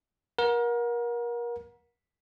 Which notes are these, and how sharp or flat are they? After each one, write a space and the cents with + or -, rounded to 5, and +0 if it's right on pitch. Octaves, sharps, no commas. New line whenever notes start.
A#4 +30 F#5 -25